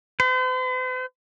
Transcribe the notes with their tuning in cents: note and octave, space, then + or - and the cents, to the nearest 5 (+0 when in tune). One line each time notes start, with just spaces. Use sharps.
C5 -45